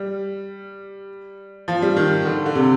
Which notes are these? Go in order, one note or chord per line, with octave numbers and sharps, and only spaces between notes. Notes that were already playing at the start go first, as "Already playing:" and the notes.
Already playing: G3
F3
G3
D#3
D3
D3
C3